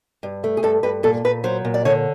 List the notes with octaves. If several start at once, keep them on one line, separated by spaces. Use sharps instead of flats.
G2
A3
G#4
G2 A4
G2 B4
A#2 A4
A#2 B4
F#3 C5
A#2
D5
D3 C#5